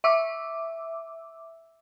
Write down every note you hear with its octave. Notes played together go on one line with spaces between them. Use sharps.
E5 D6 E6